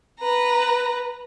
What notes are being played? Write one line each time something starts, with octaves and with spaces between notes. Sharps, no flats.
B4 A#5